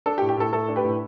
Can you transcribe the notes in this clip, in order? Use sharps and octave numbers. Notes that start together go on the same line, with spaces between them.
D4 A4
G4
A2
G4
A2 A4
A3 A4
D4
G4 B4
A2